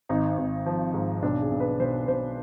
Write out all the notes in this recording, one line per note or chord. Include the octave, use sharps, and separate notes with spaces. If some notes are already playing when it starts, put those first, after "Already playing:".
G#1 D#4
G#1
F3
G#2
B1 D4
G#4
B1
B4
B1 C5
B1 C5